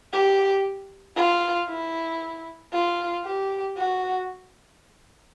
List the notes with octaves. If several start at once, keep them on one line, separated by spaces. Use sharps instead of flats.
G4
F4
E4
F4
G4
F#4